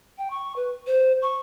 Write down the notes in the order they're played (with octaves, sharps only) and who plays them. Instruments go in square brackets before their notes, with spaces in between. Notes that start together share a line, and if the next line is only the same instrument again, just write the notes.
[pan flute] G5
C#6
B4
C5
C#6